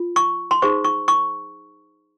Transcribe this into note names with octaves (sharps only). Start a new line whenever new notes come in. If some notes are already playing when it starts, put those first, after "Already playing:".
Already playing: F4
C#6
C6
D#4 G#4 C5 C#6
C#6
C#6